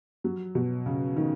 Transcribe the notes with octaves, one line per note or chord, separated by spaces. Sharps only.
F#3
B2
C#3
D#3